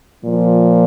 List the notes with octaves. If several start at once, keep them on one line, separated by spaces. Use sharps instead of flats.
A#2 F3